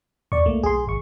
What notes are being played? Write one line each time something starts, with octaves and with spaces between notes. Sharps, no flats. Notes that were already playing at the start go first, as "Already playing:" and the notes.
E2 D5 C#6
C2 A3 A#3
B1 G#4 C6
G#1 C#6